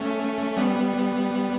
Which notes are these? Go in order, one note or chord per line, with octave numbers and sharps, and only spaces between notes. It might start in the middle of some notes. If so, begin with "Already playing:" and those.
Already playing: A3 C#4
G3 B3